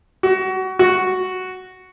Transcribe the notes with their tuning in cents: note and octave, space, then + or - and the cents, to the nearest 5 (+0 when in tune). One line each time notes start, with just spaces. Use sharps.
F#4 +25
F#4 +0